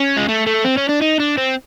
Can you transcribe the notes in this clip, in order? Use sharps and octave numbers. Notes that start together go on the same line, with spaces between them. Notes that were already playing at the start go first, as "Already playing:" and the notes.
Already playing: C#4
G#3
A3
A3
C4
C#4
D4
D#4
D4
C4